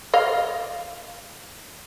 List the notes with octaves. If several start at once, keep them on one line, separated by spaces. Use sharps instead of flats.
D#5 F5